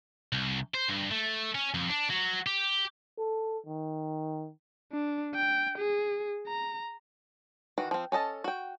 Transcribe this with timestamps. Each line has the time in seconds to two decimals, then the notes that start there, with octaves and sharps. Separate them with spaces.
0.33 C2
0.74 C5
0.89 G2
1.11 A3
1.55 C#4
1.74 F2
1.89 D4
2.10 F#3
2.46 G4
3.18 A4
3.66 D#3
4.92 D4
5.35 G5
5.78 G#4
6.48 A#5
7.78 D#3 E3 F#4
7.91 F3 C4
8.12 C#4 A4 D#5 A5
8.44 F#4 G5